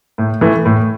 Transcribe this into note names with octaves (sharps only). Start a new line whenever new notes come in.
A2
E3 A3
A2